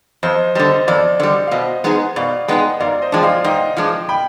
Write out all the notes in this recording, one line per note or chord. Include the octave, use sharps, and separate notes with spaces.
F2 C5 D#5
D3 G3 C5 D#5
F2 D5
D3 G3 D5
F5
B2 C5 D#5
G#3 B3 D#4 G#4
B2 D5 F5
G#3 B3 D#4 G#4 D#5 G5
G#2 D5 F5
C5 D#5
F3 G#3 D4 G5
D5 F5
G#2 D#5 G5
F3 G#3 D4
G5 B5